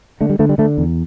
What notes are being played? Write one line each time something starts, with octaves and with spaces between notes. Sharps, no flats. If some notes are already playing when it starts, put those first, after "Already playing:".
D3 A3
G3
D3 A3
G3
D3 A3
E2